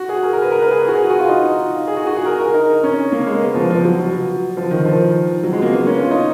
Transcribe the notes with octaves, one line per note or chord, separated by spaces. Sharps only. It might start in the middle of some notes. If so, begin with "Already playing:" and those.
Already playing: F#4
G#4
A#4
A#4
B4
A#4
B4
G#4
G#4
F#4
G#4
F#4
F4
D#4
G#4
F#4
F#4
G#4
A#4
A#4
D#4
C#4
A#3
G#3
B3
F3
F3
F#3
F#3
F3
D#3
F3
F#3
G#3
A#3
B3
C#4
F4
D#4